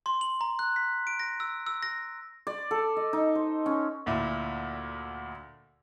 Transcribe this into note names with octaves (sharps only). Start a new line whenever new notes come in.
C6
F#7
A#5
F#6
B6
D7
A#6
E6
E6
A#6
D5
A4
D#5
D#4
C5
C#4
D2 A#2 E4